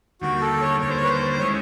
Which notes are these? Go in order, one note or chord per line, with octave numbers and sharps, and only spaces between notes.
D#2 D3 G3 A#3 F#4
A4
C#5
D#2 D3 G3 A#3 C#5
C5
C#5
B4
C5
D#3 G#3 C#4 E4 C#5